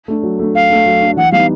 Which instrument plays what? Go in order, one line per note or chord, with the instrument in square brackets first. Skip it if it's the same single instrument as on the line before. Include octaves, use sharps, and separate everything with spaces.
[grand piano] A3 D4
F#3
A3 D4
[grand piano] F#3 [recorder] F5
[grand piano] A3 D4
F#3
A3 D4
[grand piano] E3 [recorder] F#5
[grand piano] G3 B3 D#4 [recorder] F5